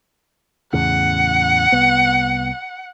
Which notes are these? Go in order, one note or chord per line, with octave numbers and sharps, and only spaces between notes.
E2 A2 C#3 F#5
C2 B3